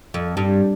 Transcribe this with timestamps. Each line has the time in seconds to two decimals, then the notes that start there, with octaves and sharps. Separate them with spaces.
0.14 F2
0.37 G2